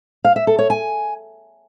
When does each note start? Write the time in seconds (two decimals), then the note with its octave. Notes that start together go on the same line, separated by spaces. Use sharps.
0.24 F5
0.36 E5
0.47 A4
0.59 C#5
0.70 G#5